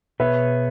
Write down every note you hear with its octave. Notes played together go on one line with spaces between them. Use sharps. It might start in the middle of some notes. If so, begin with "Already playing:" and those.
B2 B3 G#4 B4 C#5 E5